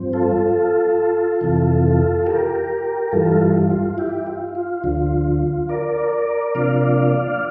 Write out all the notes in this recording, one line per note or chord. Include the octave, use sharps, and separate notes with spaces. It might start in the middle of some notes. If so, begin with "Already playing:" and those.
Already playing: G2 F3 C4
F4 A4
F2 C3 E3
G4 A#4
G2 E3 G3 F4 A4
F4
F4
E4 G4
F4
F4
D2 D3 F3
A#4 D5
C3 F3 A#3 D4 D5 F5